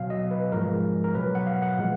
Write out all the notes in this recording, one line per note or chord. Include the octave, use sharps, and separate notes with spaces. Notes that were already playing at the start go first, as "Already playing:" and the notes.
Already playing: B2 F#3 F5
D#5
B4
G#2 F3 G#3 A#4
A#4
B2 F#3 B4
F#5
F5
F#5
A#2 F3 G#3